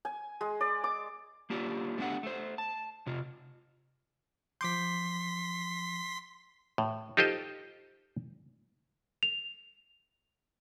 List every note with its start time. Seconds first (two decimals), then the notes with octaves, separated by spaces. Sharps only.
0.05 G#5
0.41 G#3
0.61 D5
0.84 D6
1.50 A#3 D4 F4 G4
1.98 A3 B3 D4 G4 F#5
2.23 A3 C5
2.58 A5
3.07 C3 F4
4.61 F3 C6 D6 G6 B6
6.78 A2
7.17 D#4 F4 G4 A4 C5 D#5
9.23 F7